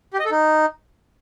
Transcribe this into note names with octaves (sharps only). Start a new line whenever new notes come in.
G4
D#5
A4
D#4